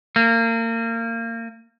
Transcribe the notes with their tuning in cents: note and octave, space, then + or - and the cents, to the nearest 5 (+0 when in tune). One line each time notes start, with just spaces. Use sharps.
A#3 -30